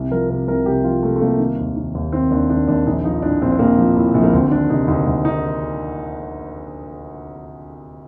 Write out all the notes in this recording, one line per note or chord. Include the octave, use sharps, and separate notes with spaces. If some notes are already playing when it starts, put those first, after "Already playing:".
Already playing: C2
F3 A#4
C3 A#4
C2 A#4
C2 G4
F3 F4
C3 A3
A3
C2 A#3
D#3
D#2
D#3
D#2
D#3 C4
D#2 D4
D#3 D4
D#2 D4
A#1 D#4
F3 D#4
A2 D4
A#1 C4
C4
A#1 A#3
F3
A2
A#1
A#3
D2 C4
D#3 D4
C3 D#4
D2 D#4
D2
D#3 D#4